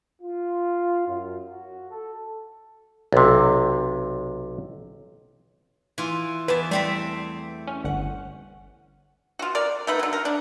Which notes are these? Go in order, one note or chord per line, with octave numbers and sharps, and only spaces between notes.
F4
F#2
F#4
A4
B1 C3
E3 F4
E2 B4 A5
G3 A3 C4 E5
C#4
G1 F#5
F4 F#4
A#4 D5
A3 D#4 B4
D3 F#3
A#4
D4